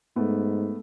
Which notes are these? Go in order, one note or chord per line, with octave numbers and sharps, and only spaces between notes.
G#2 A3 B3